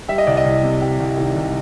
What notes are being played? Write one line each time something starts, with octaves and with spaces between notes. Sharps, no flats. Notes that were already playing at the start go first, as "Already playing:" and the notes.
G3 E5
D#5
C2 D5
D#5
C2
C3
G3
C2
D#3
C2